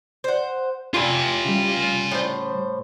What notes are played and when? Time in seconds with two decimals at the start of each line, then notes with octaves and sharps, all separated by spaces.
0.24 C5 F#5
0.94 E4 F4 G4 G#5
1.45 C#3 G3
2.11 A2 C5